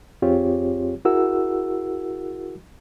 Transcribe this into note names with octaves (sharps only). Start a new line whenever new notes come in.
F2 C4 F4 G4 G#4 C#5
E4 F#4 G#4 A#4 F#5 E6